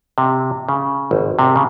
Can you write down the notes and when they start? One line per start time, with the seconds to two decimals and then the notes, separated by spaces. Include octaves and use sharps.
0.18 C3
0.69 C#3
1.11 G#1
1.39 C3
1.56 C#3